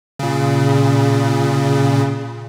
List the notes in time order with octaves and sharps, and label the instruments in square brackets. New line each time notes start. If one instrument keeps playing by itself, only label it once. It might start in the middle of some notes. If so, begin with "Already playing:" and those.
[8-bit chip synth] A#2 C#3